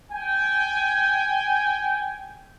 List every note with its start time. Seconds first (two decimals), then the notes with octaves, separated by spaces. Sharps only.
0.12 G5 G#5